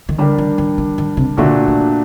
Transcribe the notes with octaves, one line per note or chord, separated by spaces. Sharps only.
D#3
D3 G3 D4 G4 A#4
D#3
D#3
D#3
D#3
C3
A#2 D3 A3 D4 F#4
D#3